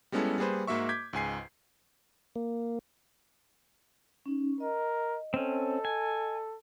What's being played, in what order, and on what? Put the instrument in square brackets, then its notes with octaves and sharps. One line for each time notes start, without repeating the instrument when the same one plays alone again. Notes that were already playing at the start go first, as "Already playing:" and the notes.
[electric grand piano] G3 G#3 B3 C#4 E4 A4
G3 A#3 G#4 B4 C5
G#2 A#3 F#4 E5 C#6
D6 G6 G#6 B6
C#2 G#2 G#5 C7
[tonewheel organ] A#3
[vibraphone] C#4 D#4
[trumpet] A#4 [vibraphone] D#5
[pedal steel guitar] C4 C#4 [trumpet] A4
[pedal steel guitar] G#5